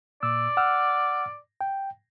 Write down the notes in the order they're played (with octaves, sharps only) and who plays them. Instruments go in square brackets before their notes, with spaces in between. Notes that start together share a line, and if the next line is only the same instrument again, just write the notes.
[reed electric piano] A#2 E6 [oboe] D5
[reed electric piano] F#5 E6 F6
G5